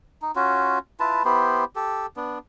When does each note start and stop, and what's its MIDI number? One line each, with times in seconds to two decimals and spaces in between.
0.22 0.31 63
0.36 0.78 61
0.36 0.78 65
0.36 0.78 66
1.00 1.23 64
1.00 1.23 65
1.00 1.23 71
1.00 1.23 81
1.25 1.64 59
1.25 1.64 64
1.25 1.64 67
1.25 1.64 72
1.76 2.06 67
1.76 2.06 69
2.17 2.39 59
2.17 2.39 62